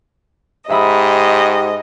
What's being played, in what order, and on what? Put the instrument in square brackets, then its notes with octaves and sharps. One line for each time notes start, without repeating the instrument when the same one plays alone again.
[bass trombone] G#2 [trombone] G4 [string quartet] D#5 [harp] E5 B5 D#6